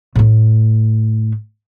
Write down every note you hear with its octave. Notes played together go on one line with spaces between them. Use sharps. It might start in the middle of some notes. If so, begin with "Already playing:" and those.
A2 A3